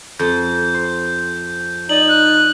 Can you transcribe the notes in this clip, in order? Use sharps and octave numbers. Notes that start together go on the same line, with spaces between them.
F2 G6
C5
D#4 D5 F#7
F#6